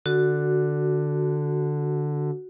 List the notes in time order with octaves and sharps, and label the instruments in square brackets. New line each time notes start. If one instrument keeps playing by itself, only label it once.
[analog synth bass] D3 [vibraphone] F#4